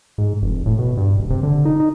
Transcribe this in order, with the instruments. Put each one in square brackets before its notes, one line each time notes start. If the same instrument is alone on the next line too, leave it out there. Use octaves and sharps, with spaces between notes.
[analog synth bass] G#2
F1
A2
B2
G2
D1
C3
D3
D#4
D#4